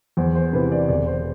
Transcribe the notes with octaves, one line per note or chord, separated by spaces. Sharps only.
E2 C5
C5
C3 E3 B4
D5
E1 D5
C5